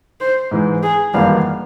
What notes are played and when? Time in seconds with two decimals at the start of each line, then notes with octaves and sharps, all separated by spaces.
0.20 C5
0.51 G#2 E3 G#3
0.83 G#4
1.14 G#1 G2 E3 A#3 F4 F5